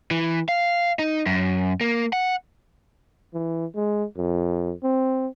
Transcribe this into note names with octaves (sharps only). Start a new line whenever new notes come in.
E3
F5
D#4
F#2
A#3
F#5
E3
G#3
F2
C4